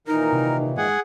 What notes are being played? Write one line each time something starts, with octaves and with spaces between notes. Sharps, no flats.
A#2 D#3 E3 D#4 A#4
C3
G#2 G#4 F#5 G#5